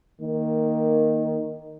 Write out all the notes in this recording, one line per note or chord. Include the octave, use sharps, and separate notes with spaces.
D#3 A#3